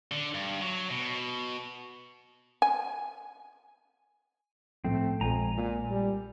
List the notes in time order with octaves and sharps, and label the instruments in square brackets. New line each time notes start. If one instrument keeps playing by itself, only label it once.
[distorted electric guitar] D3
G2
F#3
B2
[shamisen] G#5
[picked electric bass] A2 F3 [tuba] A3 [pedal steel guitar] C4
[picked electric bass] A#1 G#3 [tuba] F2 [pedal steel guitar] G#5 A#5
[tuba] A#2
G3